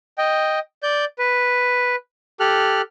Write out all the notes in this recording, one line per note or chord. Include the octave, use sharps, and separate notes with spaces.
D#5 G5
D5 G6
B4
G4 A4 F6 F#6